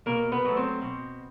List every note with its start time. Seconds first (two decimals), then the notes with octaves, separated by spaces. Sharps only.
0.06 B2 A#3 A#4
0.32 B3 B4
0.45 F#3 A3
0.56 C4 C5
0.81 B2